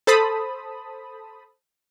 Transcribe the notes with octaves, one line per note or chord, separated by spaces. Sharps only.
A4 C5 A5 B5 D#6